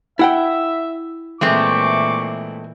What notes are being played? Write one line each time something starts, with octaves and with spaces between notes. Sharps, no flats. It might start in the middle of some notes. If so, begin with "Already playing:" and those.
E4 E5 F#5 G5
A#2 E3 G#3 A3 C4 C#6 D6